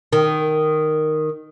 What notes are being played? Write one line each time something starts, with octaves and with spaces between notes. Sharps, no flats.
D#3